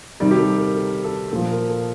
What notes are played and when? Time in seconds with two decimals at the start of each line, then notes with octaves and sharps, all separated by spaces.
0.20 C3 D#3 G3 D5
0.31 G4
0.38 A4
0.57 A#4
0.76 A4
1.04 A4
1.31 A#2 F3 A4
1.50 A#4
1.69 A4